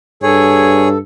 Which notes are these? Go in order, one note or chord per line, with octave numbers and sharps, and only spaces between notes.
G2 G#4 A4 C#5